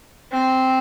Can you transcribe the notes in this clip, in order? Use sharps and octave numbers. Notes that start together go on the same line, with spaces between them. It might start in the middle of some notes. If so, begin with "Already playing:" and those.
C4